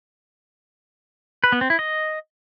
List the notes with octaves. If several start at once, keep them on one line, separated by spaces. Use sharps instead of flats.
B4
B3
C4
E4
D#5